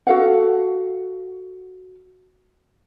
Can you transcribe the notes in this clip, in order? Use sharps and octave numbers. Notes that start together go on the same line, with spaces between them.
F#4 A4 F5 F#5